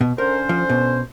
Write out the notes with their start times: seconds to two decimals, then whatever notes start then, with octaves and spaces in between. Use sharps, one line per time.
0.01 B2
0.18 D3 C#4 A#4 C5
0.49 F3
0.70 B2